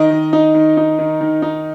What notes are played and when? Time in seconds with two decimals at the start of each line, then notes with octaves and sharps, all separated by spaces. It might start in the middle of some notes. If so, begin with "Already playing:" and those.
Already playing: D#3 D#5
0.11 D#3
0.33 D#4
0.54 D#3
0.77 D#4
0.99 D#3
1.21 D#3
1.42 D#4